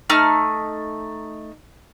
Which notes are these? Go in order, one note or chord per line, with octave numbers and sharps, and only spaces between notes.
A3 D#4 F6